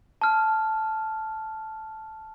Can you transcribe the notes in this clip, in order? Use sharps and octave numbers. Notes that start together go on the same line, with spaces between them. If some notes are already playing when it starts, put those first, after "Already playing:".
A5 F6